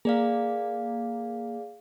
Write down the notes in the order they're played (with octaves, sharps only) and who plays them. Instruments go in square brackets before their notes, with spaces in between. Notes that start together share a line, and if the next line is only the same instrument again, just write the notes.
[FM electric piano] A#3 [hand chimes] G#4 D5 F5